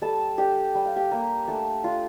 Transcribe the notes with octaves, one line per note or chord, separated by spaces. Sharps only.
G3 A4 A5
D4 G4 G5
G3 G5
F5
G4 G5
G3 A#3 A#4
A3 D4 A4
D4 F4